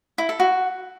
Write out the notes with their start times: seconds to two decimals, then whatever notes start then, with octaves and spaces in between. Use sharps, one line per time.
0.18 E4
0.29 A4
0.40 F#4